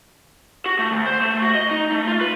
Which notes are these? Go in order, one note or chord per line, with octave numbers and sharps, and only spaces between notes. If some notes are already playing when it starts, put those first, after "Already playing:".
F#4
A3
D2
C5
A3
F#4
D#5
D#4
A3
F4
B4